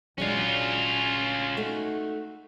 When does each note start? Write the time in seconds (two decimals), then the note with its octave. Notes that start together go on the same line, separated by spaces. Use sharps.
0.18 D#1 A#1 F#3 G#3 C#4 D4 F4
1.57 A3 D#4 F#4